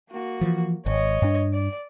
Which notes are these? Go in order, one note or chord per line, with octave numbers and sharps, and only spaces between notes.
A#3 F#4
E3 F3
G#1 C#5 D#5
G2 D4
D5